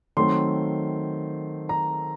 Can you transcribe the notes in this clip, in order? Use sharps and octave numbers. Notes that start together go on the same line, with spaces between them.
D#3 F#3 A3 C4 C6
A#5